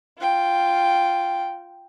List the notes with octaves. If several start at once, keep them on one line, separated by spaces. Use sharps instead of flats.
F4 G5